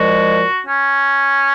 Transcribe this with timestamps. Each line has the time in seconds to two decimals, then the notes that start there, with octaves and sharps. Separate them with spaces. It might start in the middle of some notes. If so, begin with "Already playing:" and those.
Already playing: A#2 F3 G#3 F#4
0.65 C#4